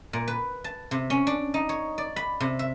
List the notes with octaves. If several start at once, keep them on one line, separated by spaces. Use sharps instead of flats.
A#2
B4
A5
C3
C#4
D4
D#4
C#5
D5
B5
C3
E5